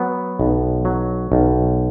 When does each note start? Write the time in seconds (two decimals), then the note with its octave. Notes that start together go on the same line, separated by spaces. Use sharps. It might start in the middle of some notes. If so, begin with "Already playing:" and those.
Already playing: F#3 B3
0.40 B1
0.85 F#3
1.32 B1